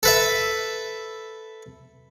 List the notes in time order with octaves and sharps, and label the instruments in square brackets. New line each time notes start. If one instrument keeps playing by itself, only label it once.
[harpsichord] A4 B4 E5